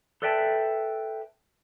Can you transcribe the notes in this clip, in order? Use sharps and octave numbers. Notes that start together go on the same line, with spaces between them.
A4 B4 D5 E5 G5 A5